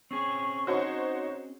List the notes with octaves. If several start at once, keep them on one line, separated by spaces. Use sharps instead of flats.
C4 C#4 G#4 C#6
D#4 F#4 C5 C#5